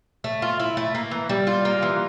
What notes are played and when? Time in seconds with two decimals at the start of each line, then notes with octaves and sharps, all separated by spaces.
0.24 A3
0.42 F4
0.59 E4
0.77 A3
0.95 A#3
1.11 E3
1.29 G3
1.47 F4
1.65 A#3
1.82 E3